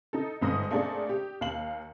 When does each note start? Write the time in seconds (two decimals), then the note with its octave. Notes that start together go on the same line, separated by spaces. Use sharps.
0.13 D#4 A4
0.42 G1 G#2 D#6 A#6
0.71 A3 A#3 C4 D4 G#4 D5
1.09 G4
1.41 D#2 F5 F#7